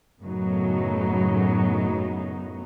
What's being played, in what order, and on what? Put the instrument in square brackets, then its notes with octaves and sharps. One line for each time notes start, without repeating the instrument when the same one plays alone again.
[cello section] F#2 A2 C#3 F#3 B3 D#4